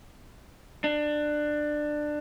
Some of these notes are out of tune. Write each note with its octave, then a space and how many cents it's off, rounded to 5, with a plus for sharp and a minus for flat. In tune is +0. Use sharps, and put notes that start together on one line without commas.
D4 +20